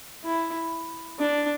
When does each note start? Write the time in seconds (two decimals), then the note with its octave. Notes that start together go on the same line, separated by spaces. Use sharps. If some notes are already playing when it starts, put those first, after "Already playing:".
0.24 E4
1.19 D4